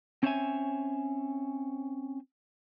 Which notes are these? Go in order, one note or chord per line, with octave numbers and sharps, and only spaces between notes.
C4 C#4 C5 C#5 E5 G#5